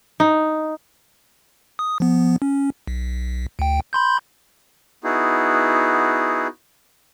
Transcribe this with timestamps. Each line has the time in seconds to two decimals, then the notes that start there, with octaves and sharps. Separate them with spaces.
0.20 D#4
1.79 D#6
2.00 F3 B3
2.42 C#4
2.88 B1
3.59 D2 G5
3.93 B5 C6 G6
5.04 B3 D#4 E4 F#4 G#4